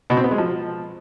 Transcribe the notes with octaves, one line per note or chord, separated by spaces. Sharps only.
B2
C4
B3
G#3
F3